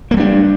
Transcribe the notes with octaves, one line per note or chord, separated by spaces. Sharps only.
G3 G#3 A#3 D4